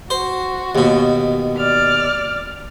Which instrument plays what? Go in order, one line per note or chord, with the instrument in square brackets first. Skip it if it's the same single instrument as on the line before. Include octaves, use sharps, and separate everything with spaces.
[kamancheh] F#4 [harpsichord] C5
[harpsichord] D#2 B2
[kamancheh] D5 F6